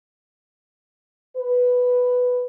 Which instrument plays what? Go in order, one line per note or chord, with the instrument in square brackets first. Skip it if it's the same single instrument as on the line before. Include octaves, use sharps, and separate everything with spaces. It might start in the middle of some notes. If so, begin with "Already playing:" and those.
[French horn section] B4